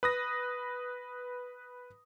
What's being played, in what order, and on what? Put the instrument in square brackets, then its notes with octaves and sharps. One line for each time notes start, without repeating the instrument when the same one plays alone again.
[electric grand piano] B4 D#6 A#6